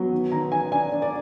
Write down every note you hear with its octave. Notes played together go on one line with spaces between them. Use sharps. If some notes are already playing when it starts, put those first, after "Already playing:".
Already playing: F#3 B3
D#3
D#3 A#5
D#3 G#5
D4 G#5
D4
D5